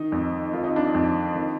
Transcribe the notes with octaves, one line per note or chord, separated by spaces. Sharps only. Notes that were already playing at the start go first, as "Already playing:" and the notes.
Already playing: D#3 D#4
F2
D#3 F4
D#4
D4
D#4
F2
D#3